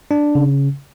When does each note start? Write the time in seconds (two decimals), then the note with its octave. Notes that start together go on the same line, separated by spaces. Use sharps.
0.11 D4
0.35 C#3